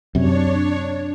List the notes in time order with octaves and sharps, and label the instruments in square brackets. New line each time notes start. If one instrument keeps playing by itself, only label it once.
[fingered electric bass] F#2 C3 [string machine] D4 C#5